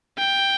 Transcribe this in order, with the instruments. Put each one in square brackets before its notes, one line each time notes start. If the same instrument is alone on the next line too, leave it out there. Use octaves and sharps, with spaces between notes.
[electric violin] G5